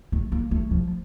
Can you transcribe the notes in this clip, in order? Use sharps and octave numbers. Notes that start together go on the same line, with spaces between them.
A3
A#3
A3
F3